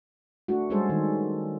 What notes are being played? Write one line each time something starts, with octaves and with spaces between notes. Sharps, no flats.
A3 D4 F#4
G3 G#3 C#4 G#4 A4 C5
D#3